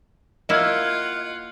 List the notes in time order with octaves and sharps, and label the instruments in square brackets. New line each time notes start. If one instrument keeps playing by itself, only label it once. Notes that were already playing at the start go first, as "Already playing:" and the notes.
[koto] A#3 E4 [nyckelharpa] F4 F#5 [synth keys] D#5 F6 G#6